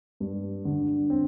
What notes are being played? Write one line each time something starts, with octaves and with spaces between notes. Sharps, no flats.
G2
D3
C4